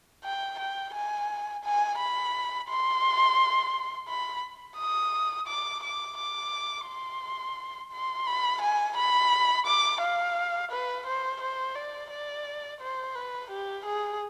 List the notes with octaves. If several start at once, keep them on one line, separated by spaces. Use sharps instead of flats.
G5
G5
G#5
G#5
B5
C6
B5
D#6
D6
D6
D6
C6
C6
B5
G#5
B5
D6
F5
B4
C5
C5
D5
D5
C5
B4
G4
G#4